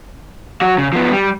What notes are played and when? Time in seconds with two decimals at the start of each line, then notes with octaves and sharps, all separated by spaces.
0.62 F#3 F#4
0.78 C#3
0.93 F3 B3
1.12 G3